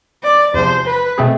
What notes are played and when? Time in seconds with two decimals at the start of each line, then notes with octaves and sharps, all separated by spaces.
0.23 D5
0.54 E2 C3 F3 C5
0.86 B4
1.18 B2 A3 C4 G#4